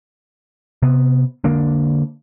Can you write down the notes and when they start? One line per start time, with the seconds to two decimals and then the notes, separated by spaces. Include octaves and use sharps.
0.82 C3 B3
1.44 D3 A#3 D4